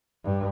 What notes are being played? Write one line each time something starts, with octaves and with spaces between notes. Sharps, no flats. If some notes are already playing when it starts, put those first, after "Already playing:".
G2